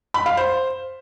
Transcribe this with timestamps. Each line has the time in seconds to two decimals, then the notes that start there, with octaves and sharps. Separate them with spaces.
0.14 B5
0.26 F5
0.37 C5